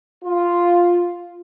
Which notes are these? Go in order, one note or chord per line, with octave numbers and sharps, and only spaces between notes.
F4